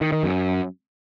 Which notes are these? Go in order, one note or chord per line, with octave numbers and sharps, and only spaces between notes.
D#3
D#3
F#2